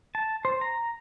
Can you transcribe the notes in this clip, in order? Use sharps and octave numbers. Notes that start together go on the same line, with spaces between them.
A5
C5
A#5